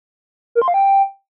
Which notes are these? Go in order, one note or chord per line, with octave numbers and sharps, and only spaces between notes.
A#4
C6
F5
G5